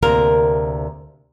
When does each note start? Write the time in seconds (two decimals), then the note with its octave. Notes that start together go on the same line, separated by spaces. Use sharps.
0.02 D2 C3 A#3 A#4